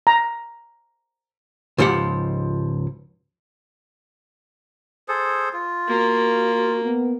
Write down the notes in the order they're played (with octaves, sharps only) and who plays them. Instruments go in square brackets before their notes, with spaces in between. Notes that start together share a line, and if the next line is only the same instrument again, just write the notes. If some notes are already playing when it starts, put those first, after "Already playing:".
[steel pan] A#5
[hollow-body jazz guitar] C#2 G#2 F3 G4 F#5
[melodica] G#4 A4 C5
F4
[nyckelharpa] A#3 [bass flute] F#4
[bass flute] B3